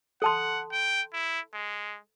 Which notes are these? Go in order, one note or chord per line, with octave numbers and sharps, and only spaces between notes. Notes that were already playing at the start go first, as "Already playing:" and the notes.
A4 F#5 A5 C6
G5
E4
G#3